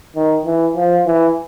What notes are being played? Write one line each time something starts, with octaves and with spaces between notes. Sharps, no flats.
D#3
E3
F3
E3